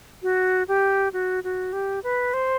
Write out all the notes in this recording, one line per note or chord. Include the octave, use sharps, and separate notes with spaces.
F#4
G4
F#4
F#4
G4
B4
C5